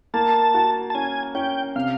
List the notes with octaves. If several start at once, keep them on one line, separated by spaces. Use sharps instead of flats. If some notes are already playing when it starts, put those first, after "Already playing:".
A#3 A5
F#4
A5
C#4 G#5
C#4 G5
C3 F5